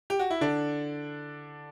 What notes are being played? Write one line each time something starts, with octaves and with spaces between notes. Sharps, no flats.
G4
F#4
E4
D3 D4